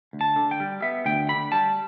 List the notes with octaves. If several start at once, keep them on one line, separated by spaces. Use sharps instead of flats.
D2
A5
D3
G5
G3
B3 E5
D2 G5
D3 B5
G3 A5